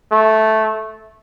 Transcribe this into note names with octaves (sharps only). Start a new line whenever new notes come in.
A3